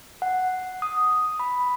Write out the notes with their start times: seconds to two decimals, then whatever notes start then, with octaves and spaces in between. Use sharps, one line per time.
0.22 F#5
0.82 D#6
1.40 B5